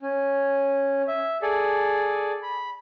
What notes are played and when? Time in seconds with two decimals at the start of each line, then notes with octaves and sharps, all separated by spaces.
0.02 C#4
1.08 E5
1.42 G#4 A4 D5
2.43 B5